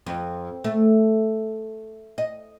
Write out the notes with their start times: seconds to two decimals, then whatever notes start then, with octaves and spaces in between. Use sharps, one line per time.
0.06 F2
0.64 A3
2.18 D#5